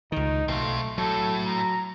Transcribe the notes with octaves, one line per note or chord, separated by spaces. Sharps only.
C#2 D#3 D#4
B1 A3 C4 F4
A2 F#3 A4
A#5